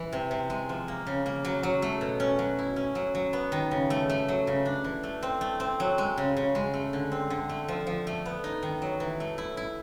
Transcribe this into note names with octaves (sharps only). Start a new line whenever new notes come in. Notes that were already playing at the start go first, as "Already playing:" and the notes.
Already playing: E3
C3
C3
G#3
F3
A#3
C#3
A#3
F#3
F#3
A3
B2
C#4
F#3
E4
C#4
F#3
F#3
B3
D#3
C#3
A3
A3
F#3
C#3
D4
E3
A3
C4
A3
C4
F#3
G#3
C#3
C#3
G#3
A3
D3
C4
D3
A3
F3
F3
A3
B3
D#4
D#3
F#3
E3
A3
E4
E4